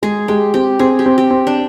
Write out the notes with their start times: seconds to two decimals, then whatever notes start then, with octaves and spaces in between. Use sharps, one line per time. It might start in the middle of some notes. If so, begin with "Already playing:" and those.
0.03 G#3 G#4
0.28 G#3 G4
0.54 C4 G4
0.79 C4 G#4
0.99 G4
1.06 C4
1.18 G4
1.31 C4
1.47 D4